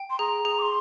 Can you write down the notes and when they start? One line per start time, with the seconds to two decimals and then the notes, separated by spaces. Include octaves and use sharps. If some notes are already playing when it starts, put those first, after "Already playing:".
Already playing: G5
0.10 C6
0.19 G#4 A#5
0.45 G#4
0.59 D6
0.62 C6